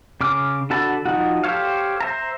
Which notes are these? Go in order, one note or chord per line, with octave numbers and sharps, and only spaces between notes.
C#3 D6 F6
D3 F#4 A4 A5 B5
F3 D#4 F#4
G4 A4 C5 C#5 F5
C5 E5 A#5